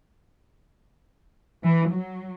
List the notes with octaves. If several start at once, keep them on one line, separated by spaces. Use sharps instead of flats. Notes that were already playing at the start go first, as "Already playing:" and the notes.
E3
F#3